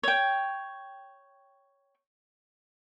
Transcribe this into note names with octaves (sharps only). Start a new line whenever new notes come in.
C#5 G5